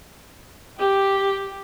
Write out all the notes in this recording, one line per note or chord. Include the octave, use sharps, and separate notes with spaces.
G4